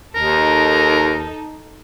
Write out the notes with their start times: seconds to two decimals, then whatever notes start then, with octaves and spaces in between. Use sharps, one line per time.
0.15 D#2 D#4 A4 A#4